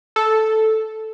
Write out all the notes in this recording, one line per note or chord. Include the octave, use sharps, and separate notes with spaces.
A4